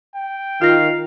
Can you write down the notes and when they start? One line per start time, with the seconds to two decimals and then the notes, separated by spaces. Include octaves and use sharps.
0.16 G5
0.62 D#3 F4 F5 A#6